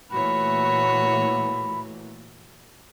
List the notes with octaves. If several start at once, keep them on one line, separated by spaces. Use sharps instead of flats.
A#2 E3 A3 F#4 C#5 B5